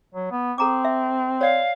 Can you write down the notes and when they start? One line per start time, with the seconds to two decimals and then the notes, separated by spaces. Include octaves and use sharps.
0.14 F#3
0.31 B3
0.58 C4 A4 A#5 D6
0.85 E5
1.41 C#5 D5 F5